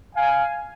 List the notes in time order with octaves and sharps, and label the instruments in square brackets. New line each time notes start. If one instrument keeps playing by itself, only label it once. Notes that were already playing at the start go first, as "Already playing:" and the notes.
[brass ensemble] F5 G#5